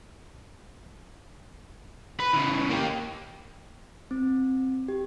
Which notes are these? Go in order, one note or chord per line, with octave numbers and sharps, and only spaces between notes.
B4
C#3 E3
A#3 G4
C4
G4